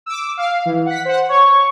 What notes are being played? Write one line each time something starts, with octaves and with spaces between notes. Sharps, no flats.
D6 E6
F5
E3
F#5 B6
C5 F#5
C#5 C#6